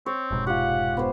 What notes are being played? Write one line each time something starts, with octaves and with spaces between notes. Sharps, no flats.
C4 C#5
F1 G#2 B2
F4 G4 F#5
B3 C5